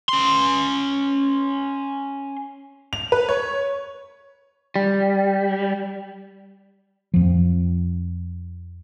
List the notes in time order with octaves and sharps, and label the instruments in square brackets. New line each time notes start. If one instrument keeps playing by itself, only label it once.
[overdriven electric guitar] C#4 C6
[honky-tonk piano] F7
B4
C#5
[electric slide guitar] G3
[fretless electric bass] F2 F3